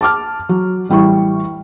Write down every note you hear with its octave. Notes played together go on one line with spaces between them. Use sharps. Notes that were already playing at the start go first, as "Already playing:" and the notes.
A5 D6 F6
F#3
A1 G3 E4 C#6